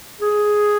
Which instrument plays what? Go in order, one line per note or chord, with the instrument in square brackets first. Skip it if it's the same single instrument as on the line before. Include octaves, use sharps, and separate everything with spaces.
[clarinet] G#4